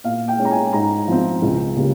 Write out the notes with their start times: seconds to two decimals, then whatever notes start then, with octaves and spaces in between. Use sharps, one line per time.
0.04 A#2 F5
0.28 G5
0.38 G#3 C#4
0.45 A#5
0.51 G#5
0.73 G#2 A#5
1.08 F3 C4
1.42 C#2
1.76 C#3 G3 A#3